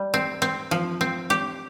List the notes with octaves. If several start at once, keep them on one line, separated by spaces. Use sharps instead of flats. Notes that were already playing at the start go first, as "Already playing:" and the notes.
Already playing: G3
C4
C4
F3
C4
G4